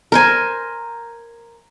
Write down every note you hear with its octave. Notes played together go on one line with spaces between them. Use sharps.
A#4 C5 G#5